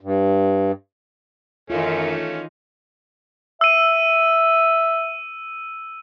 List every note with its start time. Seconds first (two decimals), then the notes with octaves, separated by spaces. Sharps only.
0.01 G2
1.70 F#2 D#3 E3 A3 C#4 D#4 F4
3.61 E5 E6 D#7